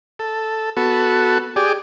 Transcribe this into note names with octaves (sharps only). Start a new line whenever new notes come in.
A4
B3 F#4 A4
G4 G#4 D5